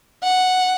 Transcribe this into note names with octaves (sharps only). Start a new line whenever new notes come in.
F#5